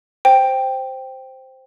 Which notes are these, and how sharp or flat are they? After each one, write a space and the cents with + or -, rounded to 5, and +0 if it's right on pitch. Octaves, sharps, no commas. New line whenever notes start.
C5 +0 G5 +0